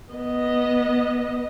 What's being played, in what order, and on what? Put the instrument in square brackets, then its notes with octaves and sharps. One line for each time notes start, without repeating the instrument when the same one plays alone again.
[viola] B3 D#5